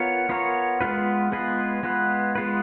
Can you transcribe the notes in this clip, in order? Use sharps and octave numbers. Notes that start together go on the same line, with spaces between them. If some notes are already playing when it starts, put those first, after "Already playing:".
Already playing: B3 F4 A#4 C#5
B3 F4 A#4 C#5
G#3 B3 F4 B4
G#3 B3 F4 B4
G#3 B3 F4 B4
G#3 B3 F4 B4